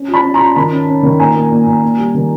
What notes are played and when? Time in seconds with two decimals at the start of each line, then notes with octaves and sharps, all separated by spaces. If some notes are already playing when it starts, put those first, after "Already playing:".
Already playing: C#4
0.08 F4
0.14 A5 B5
0.24 C#4
0.34 A#5 C6
0.40 F4
0.56 D#3 A5 B5
0.71 C#4
0.88 C#4
1.03 D#3
1.19 A#2 G#5 A#5
1.35 A#3
1.50 A#2
1.66 A#2
1.82 A#3
1.98 G3
2.15 D#3